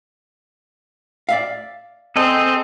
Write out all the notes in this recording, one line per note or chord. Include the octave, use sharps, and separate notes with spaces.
D5 E5 F5
C4 G#4 A4 D#5